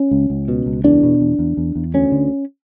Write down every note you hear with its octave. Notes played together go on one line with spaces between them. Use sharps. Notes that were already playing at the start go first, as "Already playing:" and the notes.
Already playing: C#4
C#2
C#2
B2
C#2
E2 D4
B2
E2
E2
E2
E2
D2 C#4
D3